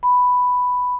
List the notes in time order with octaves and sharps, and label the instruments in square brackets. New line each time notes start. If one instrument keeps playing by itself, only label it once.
[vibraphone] B5